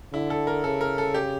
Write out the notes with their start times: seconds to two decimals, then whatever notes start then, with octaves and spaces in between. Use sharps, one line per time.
0.13 D3 E4
0.30 A4
0.47 A#4
0.64 C#3 A4
0.81 A#4
0.98 A4
1.14 G4